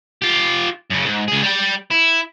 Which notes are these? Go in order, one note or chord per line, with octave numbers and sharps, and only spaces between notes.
F4 G4
F#2 C#3
G#2
C#2 G#4
G3 G5
E4